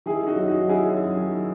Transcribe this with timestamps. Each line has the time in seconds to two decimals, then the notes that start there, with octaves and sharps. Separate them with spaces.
0.06 D#3 E4 G#4
0.27 D#4 F#4
0.35 F#2
0.48 D#4 F#4
0.62 F#3
0.69 E4 G#4
0.89 F#2
1.17 D#3